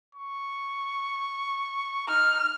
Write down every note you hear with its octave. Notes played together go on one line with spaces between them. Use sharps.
C#6
D#4 F6